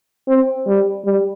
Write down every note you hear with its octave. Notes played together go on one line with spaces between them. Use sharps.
C4
G3
G3